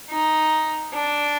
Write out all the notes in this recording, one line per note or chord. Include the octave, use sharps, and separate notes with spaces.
D#4
D4